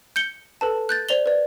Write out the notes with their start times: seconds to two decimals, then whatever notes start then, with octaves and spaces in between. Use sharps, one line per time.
0.16 G6 C#7 G7
0.61 A4 B4 A5
0.89 F#6 G6 A6
1.09 C5 D5 F7 G7
1.26 B4 D5